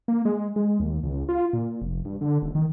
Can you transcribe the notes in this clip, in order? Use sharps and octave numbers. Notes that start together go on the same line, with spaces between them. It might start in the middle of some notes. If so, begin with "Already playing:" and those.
A#3
G#3
G#3
D#2
C#2
F4
A#2
F1
G2
D3
D#1
D#3